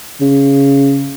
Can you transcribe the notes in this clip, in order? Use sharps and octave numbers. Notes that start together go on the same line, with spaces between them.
C#3